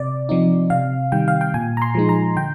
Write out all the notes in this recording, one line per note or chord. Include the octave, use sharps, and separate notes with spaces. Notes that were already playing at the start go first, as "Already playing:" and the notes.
Already playing: C3 D5
F3 C4 D#4
C3 F5
D#3 G3 G5
F5
G5
A#2 G#5
A#5
C6
F3 G#3 D#4
A#5
D3 G5